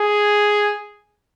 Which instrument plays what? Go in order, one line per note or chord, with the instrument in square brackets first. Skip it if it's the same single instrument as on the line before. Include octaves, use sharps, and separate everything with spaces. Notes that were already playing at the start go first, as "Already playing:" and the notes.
Already playing: [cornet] G#4